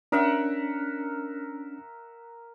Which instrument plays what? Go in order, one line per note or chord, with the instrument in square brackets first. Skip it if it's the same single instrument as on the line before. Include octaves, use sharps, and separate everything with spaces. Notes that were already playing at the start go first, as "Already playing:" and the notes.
[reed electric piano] C#4 D4 [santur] A#4 E5 F#5